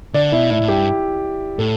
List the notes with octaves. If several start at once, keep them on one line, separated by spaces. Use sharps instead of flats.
D3 D5
B2 E4
A2 E4
A2
G2 G4
A2 A4